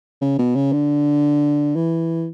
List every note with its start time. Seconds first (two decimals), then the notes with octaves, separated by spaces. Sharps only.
0.21 C#3
0.38 B2
0.55 C#3
0.72 D3
1.75 E3